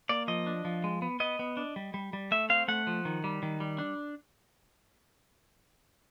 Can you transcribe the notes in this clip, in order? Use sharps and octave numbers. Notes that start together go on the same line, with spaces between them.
A#3 D5
F3 D#5
D4
F3
G#3
B3
B3 D#5
B3
D4
G3
G3
G3
A3 E5
C4 F5
A3 F#5
F3
D#3
G3
D#3
G3
D4